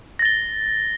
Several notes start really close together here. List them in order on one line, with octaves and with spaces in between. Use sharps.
A#6 A6 G7